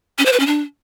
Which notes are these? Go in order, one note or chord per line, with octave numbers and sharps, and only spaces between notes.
C#4
C5
B4
C#4
D4